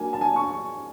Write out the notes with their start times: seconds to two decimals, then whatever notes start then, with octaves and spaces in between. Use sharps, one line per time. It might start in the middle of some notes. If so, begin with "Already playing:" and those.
Already playing: F#3 A#3 D4 G#5
0.13 A5
0.21 G#5
0.36 C#6